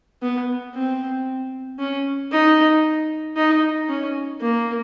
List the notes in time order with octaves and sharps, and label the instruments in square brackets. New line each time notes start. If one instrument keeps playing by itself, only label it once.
[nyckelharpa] B3
C4
C#4
D#4
D#4
C#4
A#3